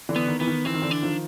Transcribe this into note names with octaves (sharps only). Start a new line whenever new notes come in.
D3 E3
B3
D#3
E3 B3
D#3
E3 C4
D#3
D3 E3
D4
D#3 F3